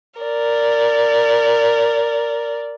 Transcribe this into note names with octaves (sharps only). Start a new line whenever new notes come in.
A#4 D5